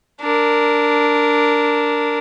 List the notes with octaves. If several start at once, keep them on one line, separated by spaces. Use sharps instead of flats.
D4 A#4